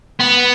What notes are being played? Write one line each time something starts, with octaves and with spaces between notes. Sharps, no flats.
B3